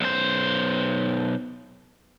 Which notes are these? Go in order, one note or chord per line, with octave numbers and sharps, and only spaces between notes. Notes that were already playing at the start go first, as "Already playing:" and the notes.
B1 C5